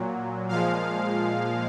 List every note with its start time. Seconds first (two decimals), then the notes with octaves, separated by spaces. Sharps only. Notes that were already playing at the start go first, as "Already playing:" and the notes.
Already playing: A#2 F#3
0.49 A#2 F3 G#3 F5